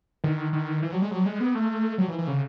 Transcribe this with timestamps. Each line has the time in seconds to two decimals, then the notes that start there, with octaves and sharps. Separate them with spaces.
0.24 D#3
0.53 D#3
0.82 E3
0.92 F#3
1.02 G#3
1.11 F#3
1.26 G#3
1.40 B3
1.55 A3
1.98 F#3
2.08 E3
2.18 E3
2.27 C#3